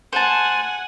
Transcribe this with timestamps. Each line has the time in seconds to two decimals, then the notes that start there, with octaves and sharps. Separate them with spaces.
0.13 C5 F#5 G#5 A5